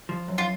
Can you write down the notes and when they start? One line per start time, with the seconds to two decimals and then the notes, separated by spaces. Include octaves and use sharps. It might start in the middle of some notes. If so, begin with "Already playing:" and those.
0.09 F3
0.28 F#2
0.38 F4